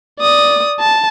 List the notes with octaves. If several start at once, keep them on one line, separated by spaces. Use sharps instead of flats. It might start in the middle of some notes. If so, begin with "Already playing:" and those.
D5 D#6
A5